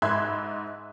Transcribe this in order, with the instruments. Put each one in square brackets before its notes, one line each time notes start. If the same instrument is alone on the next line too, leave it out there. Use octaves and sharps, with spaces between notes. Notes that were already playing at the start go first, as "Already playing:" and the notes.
[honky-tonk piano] G#2 E5 B5 C6 F#6 G#6